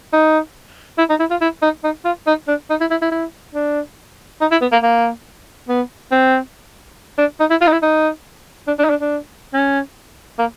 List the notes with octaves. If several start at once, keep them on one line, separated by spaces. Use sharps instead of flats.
D#4
E4
D#4
E4
F4
E4
D#4
D#4
F4
D#4
D4
D#4
E4
E4
E4
E4
D4
D#4
E4
B3
A#3
A#3
B3
C4
D4
D#4
E4
F4
D#4
E4
D#4
D4
D4
D#4
D4
D4
C#4
A#3